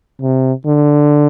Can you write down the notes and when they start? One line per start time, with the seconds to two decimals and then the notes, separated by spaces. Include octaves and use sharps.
0.22 C3
0.66 D3